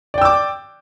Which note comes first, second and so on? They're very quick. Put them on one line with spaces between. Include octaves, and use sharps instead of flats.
D5 G5 E6 D6